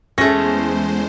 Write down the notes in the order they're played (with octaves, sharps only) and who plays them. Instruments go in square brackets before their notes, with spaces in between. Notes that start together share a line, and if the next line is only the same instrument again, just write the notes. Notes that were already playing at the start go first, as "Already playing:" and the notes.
[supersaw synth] E2 G#3 C5 [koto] A3 C#4 [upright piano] G#4 A#6